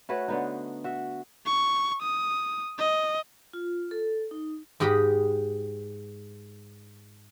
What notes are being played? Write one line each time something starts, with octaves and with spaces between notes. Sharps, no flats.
A3 F#4 B4 C#5
D3 B3 D#4
F#4 E5
C#6
D#6
D#5
F4
A4
D#4
G#2 G4 D#5 G5 B5